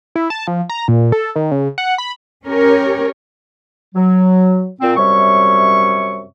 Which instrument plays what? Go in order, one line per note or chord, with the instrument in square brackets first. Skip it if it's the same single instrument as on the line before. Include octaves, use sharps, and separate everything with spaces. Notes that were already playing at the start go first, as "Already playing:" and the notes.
[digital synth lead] E4
A5
F3
A#5
A#2
A4
D#3
C#3
F#5
B5
[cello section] C#4 G4 A#4 C#5
[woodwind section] F#3
A#2 C4
F#2 C3 G3 C#5 E5 C#6